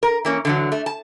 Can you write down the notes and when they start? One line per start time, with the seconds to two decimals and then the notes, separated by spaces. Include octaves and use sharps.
0.03 A#4
0.25 E3 A#3 C#4
0.45 D3 E3 F#3
0.72 A3
0.86 A5